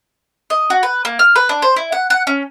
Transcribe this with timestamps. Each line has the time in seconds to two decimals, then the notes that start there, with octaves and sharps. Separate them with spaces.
0.50 D#5
0.70 F#4
0.83 B4
1.05 A#3
1.19 F6
1.36 B4
1.49 D4
1.62 C5
1.76 E4
1.92 F#5
2.10 F#5
2.27 C#4